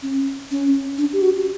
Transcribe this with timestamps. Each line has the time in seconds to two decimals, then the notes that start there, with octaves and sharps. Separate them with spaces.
0.02 C#4
0.51 C#4
0.98 D4
1.13 G4
1.22 F#4